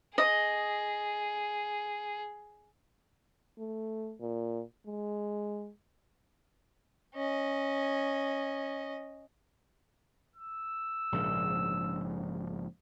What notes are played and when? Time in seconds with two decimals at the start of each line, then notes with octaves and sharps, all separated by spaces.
0.18 G#4 D#5
3.58 A3
4.20 A#2
4.86 G#3
7.15 C#4 D#5
10.36 E6
11.12 A#1 G#2 C#3